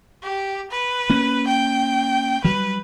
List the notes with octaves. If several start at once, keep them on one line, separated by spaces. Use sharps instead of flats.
G4
B4
A#3 C#4
G5
F#3 G3 B4